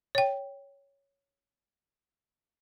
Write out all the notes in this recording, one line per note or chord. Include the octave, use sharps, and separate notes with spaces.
C#5 G5